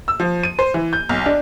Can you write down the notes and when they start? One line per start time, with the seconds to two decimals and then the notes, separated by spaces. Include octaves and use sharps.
0.08 E6
0.20 F3
0.43 D#7
0.59 C5
0.74 E3
0.93 G6
1.09 B1
1.26 D4